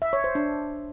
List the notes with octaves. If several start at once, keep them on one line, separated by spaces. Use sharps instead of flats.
E5
C#5
C5
D4